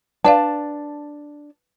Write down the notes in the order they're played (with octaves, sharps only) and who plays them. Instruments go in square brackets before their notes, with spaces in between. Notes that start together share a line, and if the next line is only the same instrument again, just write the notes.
[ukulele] D4 A5 [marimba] B4 D5 F5